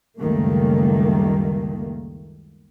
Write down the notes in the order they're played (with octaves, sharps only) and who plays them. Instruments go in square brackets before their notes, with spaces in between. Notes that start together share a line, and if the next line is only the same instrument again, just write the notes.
[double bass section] F#1 C#2 D#3 G3 A3 A#3